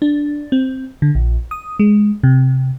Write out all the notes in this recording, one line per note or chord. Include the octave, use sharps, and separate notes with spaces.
D4
C4
D3
A#1
D#6
G#3
C3